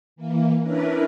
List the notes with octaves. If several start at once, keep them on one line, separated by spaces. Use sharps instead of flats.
E3 A#3
C#4 D4 E4 A#4 B4